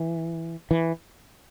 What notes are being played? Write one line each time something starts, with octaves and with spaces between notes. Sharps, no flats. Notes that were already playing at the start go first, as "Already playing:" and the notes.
Already playing: E3
E3